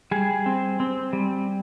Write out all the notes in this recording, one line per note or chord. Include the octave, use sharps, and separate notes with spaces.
G3 G#4
C4
C4
G3